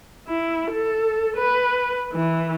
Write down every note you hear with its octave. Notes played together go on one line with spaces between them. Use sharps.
E4
A4
B4
E3